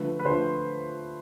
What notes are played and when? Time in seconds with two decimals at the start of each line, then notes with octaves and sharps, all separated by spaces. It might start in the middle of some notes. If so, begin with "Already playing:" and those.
Already playing: D3 F3 A3 B4
0.19 B4
0.25 D3 F3 A3 C5